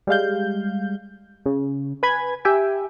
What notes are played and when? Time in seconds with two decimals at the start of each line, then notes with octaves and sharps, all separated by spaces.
0.07 G3 G#3 F5 G6
1.46 C#3
2.03 B4 G#5 B5 G#6
2.45 G4 E5 G5 G#5